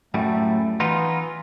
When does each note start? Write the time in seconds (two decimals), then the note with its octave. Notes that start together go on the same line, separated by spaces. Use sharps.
0.14 F#2 A2 G3 A3
0.80 E3 B3 D#4 F4